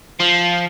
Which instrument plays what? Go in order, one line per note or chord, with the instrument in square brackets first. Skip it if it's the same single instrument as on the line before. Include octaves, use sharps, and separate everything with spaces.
[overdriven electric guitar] F3